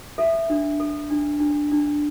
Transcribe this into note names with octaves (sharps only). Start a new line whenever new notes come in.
A4 E5
D4
A4
D4
D4
D4